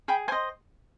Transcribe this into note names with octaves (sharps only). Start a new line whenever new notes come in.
G#4 G5 B5
C5 D#5 G#5 C6